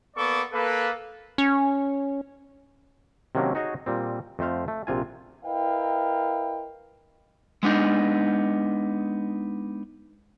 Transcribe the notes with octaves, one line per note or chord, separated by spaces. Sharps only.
A#3 B3 A4 D5 C#6 D6
A#3 A4 B4
C#4
C3 D#3 F#3 A#3 C#4 D4
D#4 F#4 G#4 C#5 D#5
A#2 G3 C4
F2 A3 C5 F5
A3
A#1 C3 F4 G#5
E4 A#4 B4 D#5 F5 G5
G#3 B3 D4 D#4